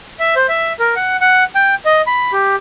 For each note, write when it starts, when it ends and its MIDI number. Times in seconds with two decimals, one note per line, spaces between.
0.20 0.35 76
0.36 0.47 72
0.48 0.73 76
0.79 0.95 70
0.96 1.17 78
1.21 1.44 78
1.55 1.75 79
1.85 2.02 75
2.07 2.32 83
2.33 2.56 67